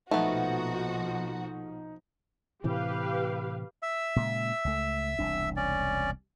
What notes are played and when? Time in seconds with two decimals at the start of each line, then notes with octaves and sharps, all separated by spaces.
0.11 A#1 B2 F3 A3 B3 D#4 F#4
2.64 A2 C3 E3 G4 B4 F5
3.83 E5 E6
4.16 A#2 C#3 G#3
4.65 C#2 A3
5.19 E1 C2 D4
5.57 C#4 D5